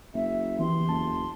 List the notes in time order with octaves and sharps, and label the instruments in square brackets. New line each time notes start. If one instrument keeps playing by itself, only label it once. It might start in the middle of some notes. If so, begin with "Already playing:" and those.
[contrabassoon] F#1 [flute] E5
[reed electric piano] E3 B3 G4 [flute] C6
[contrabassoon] F#1 [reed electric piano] E2 A5